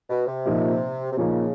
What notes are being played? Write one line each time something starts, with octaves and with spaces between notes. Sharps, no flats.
B2
C3
A#2 F3 A#3 D#4
C3
A#2 C#3 F3 A#3 D#4